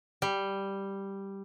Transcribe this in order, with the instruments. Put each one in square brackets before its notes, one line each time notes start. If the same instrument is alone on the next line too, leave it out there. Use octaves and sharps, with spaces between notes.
[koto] G3